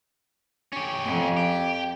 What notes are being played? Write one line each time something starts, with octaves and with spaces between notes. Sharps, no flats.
C#4 G4
F2
G4